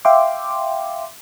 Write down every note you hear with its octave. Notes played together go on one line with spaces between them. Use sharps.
E5 F5 G5 C6 D6